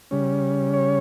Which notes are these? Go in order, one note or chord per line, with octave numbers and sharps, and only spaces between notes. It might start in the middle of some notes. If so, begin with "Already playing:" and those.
C#3 G3 C#4
C#5